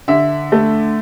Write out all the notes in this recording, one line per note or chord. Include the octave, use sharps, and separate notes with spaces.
D3 E5
A3